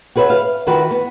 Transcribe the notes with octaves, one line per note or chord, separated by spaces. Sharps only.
F#4 G#4 B4 C#5 E5
F5
D#3 E3 D#4 F4 F#4 B4
B3